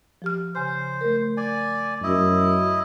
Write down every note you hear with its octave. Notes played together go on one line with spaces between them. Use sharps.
F3 G4 F6
C#3 C5 G#5 F6
A3 A#4
D5 G#5
F#2 E4 D#5